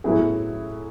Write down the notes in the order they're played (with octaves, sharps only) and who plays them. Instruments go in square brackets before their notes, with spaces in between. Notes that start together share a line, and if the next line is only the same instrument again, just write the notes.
[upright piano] A2 F#3 B3 E4 G#4